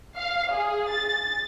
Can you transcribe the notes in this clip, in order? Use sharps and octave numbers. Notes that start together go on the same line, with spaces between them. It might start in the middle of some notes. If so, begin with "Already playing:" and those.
F5
G#4
A6